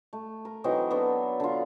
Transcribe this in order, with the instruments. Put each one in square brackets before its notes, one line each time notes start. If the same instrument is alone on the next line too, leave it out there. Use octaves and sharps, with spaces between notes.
[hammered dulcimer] A3
A#4
E3 F#3 C4 D#4
B3 D4 A4 C#5
D3 F4